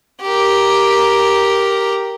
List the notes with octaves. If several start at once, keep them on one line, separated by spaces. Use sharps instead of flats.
G4 A#4